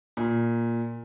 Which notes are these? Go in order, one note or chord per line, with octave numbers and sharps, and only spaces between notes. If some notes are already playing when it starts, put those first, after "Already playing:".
A#2